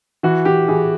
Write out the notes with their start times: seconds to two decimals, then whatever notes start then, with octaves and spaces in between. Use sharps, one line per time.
0.23 E3 F#4
0.45 E3 G4
0.68 E3 G#4